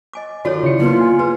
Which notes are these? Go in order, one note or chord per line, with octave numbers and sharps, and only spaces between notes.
D#5 G#5 D6
D#3 F4 F#4 A4 C#5 D5
C#3 E4 G4 C#7
A#3 B3 D#4 F4 B4
G#5
G#4 B4